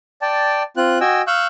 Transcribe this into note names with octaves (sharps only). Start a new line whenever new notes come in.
D5 G5 A5
C4 F4 F#6
F#4 D#5 G5 G#5 E6
F5 C#6 E6 F#6 G6